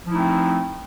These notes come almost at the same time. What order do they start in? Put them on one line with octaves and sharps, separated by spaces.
F3 E4 D#4 A3 C4